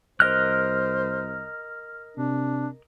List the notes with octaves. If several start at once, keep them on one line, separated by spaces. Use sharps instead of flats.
C2 A#4 C5 D#5 F6 F#6
C3 D4